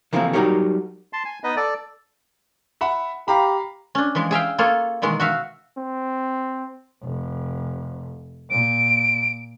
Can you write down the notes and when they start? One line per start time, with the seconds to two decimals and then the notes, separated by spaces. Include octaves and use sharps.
0.13 C#3 E3 F3 A3 A#3 C4
0.33 F#3 G3 D#4 G4 A#4 C#5
1.13 A5 C6
1.25 G#5
1.44 B3 D#4 B4 D#5
1.57 A4 D5
2.81 E5 F#5 B5
3.28 G4 F5 A#5 B5
3.95 C#4 D4
4.15 E3 F3 G#3
4.31 G#4 E5 F5 G5
4.58 A#3 F4 G#4 A4 C#5
5.02 B2 D#3 E3 G#3
5.20 F#4 E5 F5
5.78 C4
7.03 F1
8.50 A#2 D7